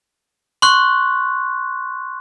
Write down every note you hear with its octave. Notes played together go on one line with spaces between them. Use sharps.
C6 C#6 F#6